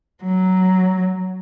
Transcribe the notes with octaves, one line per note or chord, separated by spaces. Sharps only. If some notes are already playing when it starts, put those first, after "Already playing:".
F#3